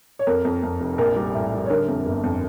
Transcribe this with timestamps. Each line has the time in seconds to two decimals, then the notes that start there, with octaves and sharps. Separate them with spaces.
0.19 C#5
0.27 F2 A#4
0.45 F2
0.63 F2
0.80 F1
0.98 A#1 A#4
1.16 G3
1.35 A2
1.52 G3
1.66 C#5
1.70 D3 A#4
1.88 F2
2.06 G1
2.24 F2